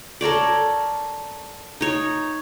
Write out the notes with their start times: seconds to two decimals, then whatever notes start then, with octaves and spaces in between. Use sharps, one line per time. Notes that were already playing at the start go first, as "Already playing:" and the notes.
0.21 A4 A#4 C#5 D5
1.81 D#4 C#5